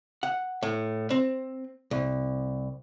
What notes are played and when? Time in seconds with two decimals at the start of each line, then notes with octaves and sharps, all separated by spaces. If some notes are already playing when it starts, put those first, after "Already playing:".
0.23 F#5
0.63 A2
1.10 C4
1.91 C2